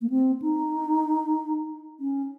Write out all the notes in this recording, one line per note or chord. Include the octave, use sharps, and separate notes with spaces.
A#3
C4
D#4
C#4